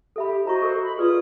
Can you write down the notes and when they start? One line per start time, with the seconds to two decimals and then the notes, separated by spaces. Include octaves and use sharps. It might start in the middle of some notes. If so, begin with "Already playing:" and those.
0.16 G4 A4 E5 B5
0.45 E4 F#4 C5 D#5 A#5 C#6
0.62 A4 A#4
0.83 B5
0.98 F4 G#4 B4 D5 D#6